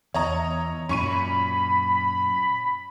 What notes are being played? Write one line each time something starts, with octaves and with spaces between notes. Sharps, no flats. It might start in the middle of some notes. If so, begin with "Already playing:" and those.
E2 C#5 D#5 A#5
F#2 A#2 C#4 B5 C#6 D#7